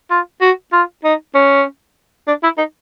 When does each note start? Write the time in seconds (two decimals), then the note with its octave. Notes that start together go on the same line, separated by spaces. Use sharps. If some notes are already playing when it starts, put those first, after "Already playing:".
0.10 F4
0.41 F#4
0.73 F4
1.04 D#4
1.35 C#4
2.28 D4
2.43 E4
2.58 D#4